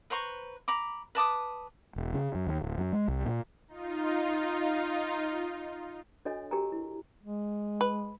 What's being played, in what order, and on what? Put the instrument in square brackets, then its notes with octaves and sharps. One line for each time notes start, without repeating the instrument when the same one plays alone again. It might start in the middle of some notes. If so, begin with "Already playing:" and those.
[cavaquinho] B4 C5 A#5 C#6
A#5 B5 D6
B4 A5 D6 D#6
[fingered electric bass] E1
C#3
F#2
D#2
D1
F#2
G#3
C2
A#2
[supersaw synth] D#4 F4
[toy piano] D4 F#4 A4 C#5 D#5 G#5
F#4 G4 A#4 C#5 G#5 A#5
E4
[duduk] G#3
[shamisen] B4